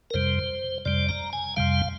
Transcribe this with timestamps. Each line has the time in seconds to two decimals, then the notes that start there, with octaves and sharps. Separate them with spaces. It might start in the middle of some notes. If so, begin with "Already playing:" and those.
0.11 A#4
0.14 F2 C3 G3 C5
0.85 F2 C3 G3 D5
1.09 A#5
1.33 G#5
1.56 F2 C3 G3 F5